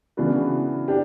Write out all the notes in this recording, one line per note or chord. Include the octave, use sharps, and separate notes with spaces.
C#3 E3 B3 D4 F#4
D4 G4